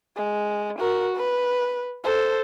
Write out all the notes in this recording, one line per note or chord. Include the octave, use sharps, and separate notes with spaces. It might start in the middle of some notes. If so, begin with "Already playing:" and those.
G#3
F#4 A#4
B4
A4 C5